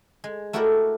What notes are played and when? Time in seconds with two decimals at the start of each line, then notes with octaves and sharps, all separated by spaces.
0.24 G#3
0.53 A3 E4 F#4 G4 A#4 D5